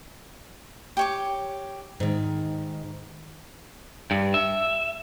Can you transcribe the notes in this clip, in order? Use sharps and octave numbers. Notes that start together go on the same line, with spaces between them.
G4 C#5 D6
G#2 D#3
G2
E5